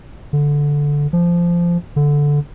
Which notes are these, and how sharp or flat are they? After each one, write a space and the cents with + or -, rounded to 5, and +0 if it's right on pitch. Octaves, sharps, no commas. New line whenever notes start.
D3 -10
F3 -15
D3 -10